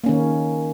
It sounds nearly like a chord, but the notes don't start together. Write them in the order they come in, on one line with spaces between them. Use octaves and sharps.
A#3 C#4 D#3